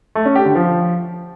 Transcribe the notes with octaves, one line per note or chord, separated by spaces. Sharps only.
A3
C#4
G4
D3
F3